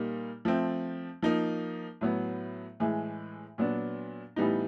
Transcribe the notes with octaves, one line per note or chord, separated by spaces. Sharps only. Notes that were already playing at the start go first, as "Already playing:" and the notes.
Already playing: A#2 G3 A#3 D#4
F3 A3 C4
F3 A#3 D#4
A2 F#3 B3
A2 E3 G#3
A#2 F#3 B3 D4
A2 E3 G3 B3 D#4